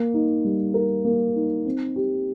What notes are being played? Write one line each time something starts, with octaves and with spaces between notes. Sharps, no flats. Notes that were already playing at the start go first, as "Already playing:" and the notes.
Already playing: A#3
D#4
G3
A#4
A#3
D#4
C4
G4